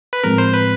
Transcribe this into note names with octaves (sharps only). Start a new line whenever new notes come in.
B4
A2 F3 G#3 C4 A#4
C5
B4